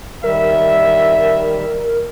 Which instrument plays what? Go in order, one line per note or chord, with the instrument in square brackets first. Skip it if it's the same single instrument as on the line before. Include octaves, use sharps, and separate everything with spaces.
[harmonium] D#3 G3 [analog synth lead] A#4 [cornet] E5